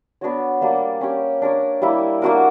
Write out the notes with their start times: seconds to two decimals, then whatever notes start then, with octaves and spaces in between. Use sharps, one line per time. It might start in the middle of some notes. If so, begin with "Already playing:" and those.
0.21 B3 D4 F#4 C#5
0.61 G3 A#3 D4
1.01 C#4 G4 C#5
1.42 D4 A#4 C#5
1.82 G3 A#3 E4
2.22 A#3 D4 F#4 A#4